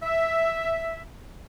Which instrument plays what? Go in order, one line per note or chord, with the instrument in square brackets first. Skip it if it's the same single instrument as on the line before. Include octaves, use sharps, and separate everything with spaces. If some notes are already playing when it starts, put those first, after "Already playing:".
[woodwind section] E5